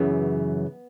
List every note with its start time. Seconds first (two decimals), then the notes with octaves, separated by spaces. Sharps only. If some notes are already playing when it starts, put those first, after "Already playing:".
Already playing: F#2 C#3 E3 B3